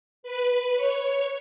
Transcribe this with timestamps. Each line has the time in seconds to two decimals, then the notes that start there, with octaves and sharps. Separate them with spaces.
0.23 B4
0.76 C#5